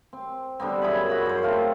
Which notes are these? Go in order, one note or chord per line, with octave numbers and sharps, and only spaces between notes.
C4
D3 G3 B3 C4
F#2 E4 G#4 B5
F#4 E5 B5
F#2 C5
A3 C4 F4